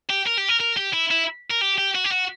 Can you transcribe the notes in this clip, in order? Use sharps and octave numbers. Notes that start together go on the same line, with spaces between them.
G4
A#4
G4
A#4
A#4
G4
E4
E4
A#4
G4
G4
F#4
G4
F#4